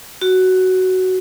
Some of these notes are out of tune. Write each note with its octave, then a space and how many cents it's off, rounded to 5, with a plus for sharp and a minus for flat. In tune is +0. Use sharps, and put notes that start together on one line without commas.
F#4 +10